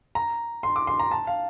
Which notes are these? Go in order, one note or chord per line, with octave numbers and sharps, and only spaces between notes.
A#5
C6
D6
C6
A#5
A5
F5